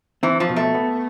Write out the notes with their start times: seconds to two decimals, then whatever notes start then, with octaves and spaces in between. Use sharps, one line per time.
0.23 E3 C4
0.40 F3
0.49 B2
0.56 A3
0.74 B3